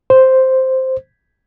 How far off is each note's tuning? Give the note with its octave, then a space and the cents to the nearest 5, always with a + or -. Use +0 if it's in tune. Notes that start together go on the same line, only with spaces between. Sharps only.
C5 +0